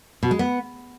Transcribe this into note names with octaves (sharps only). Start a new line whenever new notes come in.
B2
G#3
B3